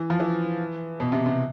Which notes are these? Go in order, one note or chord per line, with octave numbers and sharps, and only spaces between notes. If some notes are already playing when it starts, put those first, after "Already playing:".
Already playing: E3
F3
E3
B2
C3
C3